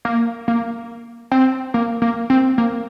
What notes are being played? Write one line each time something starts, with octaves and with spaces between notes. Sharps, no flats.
A#3
A#3
C4
A#3
A#3
C4
A#3